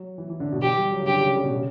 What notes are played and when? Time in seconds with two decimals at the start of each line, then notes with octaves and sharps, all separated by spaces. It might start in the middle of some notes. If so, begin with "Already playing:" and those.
Already playing: F#3
0.18 E3
0.30 E3
0.40 D3
0.52 B2
0.62 E3 G4
0.77 G3
0.92 F#3
1.00 C#3
1.07 D3 G4
1.21 C#3
1.36 C#3
1.45 B2
1.54 C#3